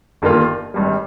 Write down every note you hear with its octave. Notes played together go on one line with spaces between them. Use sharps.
G1 G2 D#3 A#3 F4
G#1 G2 G3